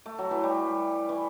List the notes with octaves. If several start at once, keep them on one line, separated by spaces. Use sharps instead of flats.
A3
F#3
E3
G3
E3